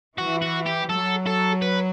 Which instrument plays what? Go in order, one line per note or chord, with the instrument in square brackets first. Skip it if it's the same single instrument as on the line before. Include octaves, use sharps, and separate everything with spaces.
[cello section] E3 [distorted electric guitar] F#4
[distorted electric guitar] F#4
G4
[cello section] F#3 [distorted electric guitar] A4
[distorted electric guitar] A4
B4